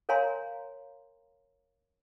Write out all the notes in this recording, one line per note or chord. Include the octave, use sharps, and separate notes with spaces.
A#4 C#5 F5 G#5 A#5 C6